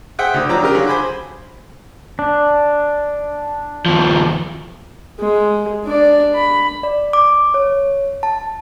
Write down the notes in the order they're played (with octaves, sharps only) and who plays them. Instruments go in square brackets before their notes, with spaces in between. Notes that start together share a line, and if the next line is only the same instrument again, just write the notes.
[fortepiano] G#4 C5 E5 F#5 G5
D2 D3 D#6
F2 F#3 D4 A#5 D6 E6
C#3 G4 A#4
D3 F#3 F4 G#4
C5 G#5 B5 D6
[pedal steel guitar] D4
[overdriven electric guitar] D#2 F3
[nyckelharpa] G#3
D4 D5
B5
[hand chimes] D5
D6
C#5
A5